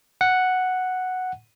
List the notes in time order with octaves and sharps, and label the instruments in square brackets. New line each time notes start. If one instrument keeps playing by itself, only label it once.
[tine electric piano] F#5